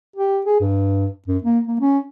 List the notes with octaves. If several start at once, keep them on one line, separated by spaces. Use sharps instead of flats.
G4
G#4
G2
F#2
A#3
A#3
C#4